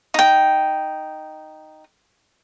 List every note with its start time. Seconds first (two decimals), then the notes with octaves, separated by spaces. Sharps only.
0.14 D#4 G5